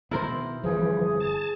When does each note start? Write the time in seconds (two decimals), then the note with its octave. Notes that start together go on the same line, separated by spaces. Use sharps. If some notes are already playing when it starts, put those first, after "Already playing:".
0.11 B2 D#3 B3 E4 A#4 C5
0.64 G1 F2 E3 F3 G3 G#4
1.20 A5